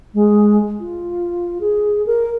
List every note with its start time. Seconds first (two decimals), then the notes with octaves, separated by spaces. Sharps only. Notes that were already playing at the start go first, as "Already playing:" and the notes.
0.14 G#3
0.80 F4
1.61 G#4
2.06 A#4